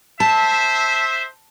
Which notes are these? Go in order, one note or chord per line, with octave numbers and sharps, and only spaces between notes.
C5 E5 A5